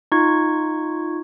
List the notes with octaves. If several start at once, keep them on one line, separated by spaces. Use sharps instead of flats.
D#4 F4 C#6 G#6